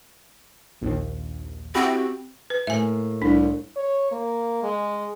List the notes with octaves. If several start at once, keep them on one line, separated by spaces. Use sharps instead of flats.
A#1 D#2
C4 E4 F#4 G4
B4
A2 A#3 E5 G#5
C2 D4
C#5
A#3
G#3